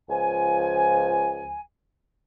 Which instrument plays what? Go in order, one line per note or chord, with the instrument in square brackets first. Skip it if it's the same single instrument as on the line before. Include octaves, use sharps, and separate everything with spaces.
[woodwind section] C#2 F3 G#5